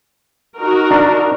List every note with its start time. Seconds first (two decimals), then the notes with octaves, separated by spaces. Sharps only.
0.59 D#4 F#4 A#4
0.91 D4